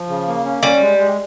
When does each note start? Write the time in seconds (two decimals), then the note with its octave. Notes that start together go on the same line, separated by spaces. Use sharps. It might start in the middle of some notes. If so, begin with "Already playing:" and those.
Already playing: F3
0.09 C#3
0.28 A#3
0.45 C#4
0.63 G3 C#4
0.81 G#3
0.98 G#3